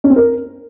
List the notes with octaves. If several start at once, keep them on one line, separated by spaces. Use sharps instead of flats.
C#4
C4
A#4